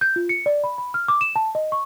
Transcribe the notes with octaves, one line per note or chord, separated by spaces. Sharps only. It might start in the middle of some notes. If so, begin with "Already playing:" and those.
G6
F4
C#7
D5
B5
B5
F6
D6
E7
A5
D#5
C#6